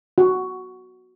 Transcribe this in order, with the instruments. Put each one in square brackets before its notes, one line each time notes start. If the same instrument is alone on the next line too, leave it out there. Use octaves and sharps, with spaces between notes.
[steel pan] F#4